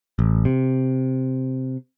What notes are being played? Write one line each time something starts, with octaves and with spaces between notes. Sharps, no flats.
A1
C3